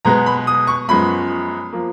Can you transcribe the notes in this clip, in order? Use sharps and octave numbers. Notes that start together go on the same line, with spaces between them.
B2 G#3 B3 A#5
B5
D#6
C#6
F#2 F3 G#3 B3 B5
F3 A#3